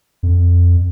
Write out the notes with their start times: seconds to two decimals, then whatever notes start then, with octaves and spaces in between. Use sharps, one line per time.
0.23 F2